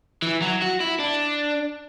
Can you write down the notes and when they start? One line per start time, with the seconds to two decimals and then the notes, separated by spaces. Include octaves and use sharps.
0.22 E3
0.42 F#3
0.62 F#4
0.80 E4
0.99 D4